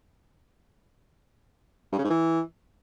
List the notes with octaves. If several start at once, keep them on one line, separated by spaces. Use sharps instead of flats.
G2
C#3
G#2
E3